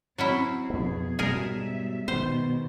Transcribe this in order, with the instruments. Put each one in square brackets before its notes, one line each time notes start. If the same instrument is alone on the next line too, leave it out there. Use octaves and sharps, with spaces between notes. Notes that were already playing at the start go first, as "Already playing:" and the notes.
[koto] F#3 C#4 E4 [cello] C4
[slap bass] F2 B3 [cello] B2 G#4
[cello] G#2 E5 [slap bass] B2 F#3 G3 [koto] G#4 A#4
[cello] G#2 B2 [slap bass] D#3 B3 [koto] C5